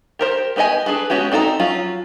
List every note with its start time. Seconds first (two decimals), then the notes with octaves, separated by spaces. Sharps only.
0.19 G4 A#4 C5
0.56 B3 G4 B4 D#5 G#5
0.86 D4 G#4 A4 B4
1.10 G#3 B3 C#4 F#4 G4
1.32 C4 D#4 A4 F5 A#5
1.59 F3 F#3 C#4 F4